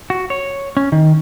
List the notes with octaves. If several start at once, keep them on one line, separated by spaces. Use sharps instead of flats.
F#4
C#5
C#4
D#3